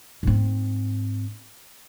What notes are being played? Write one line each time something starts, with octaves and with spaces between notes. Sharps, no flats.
G#2 C4